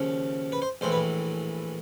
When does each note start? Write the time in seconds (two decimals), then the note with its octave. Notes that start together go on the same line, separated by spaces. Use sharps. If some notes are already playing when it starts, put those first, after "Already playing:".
Already playing: D#2 C#3 F3
0.52 B4
0.62 C5
0.81 A#1 A2 E3 C5
0.92 B4